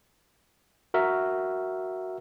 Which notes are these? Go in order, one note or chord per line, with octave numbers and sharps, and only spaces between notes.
F#4 A#4 E5